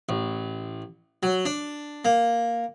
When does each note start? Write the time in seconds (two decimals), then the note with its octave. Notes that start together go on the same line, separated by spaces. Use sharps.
0.09 A1
1.23 F#3
1.45 D4
2.05 A#3